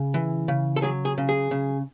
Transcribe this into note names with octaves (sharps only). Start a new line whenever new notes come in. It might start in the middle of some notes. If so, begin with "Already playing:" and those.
Already playing: C#3
E3
C#3
A4
F#3 G#4
G#4
C#3
G#4
C#3